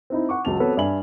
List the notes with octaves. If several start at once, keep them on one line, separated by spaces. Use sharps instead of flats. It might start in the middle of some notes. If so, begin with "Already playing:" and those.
C4 D#4 E4
F#5 C#6 D6
C#2 F#3 A5 F7
B3 C4 F#4 A4 B4 C#5
G2 D5 E5 G#5 B5 F#7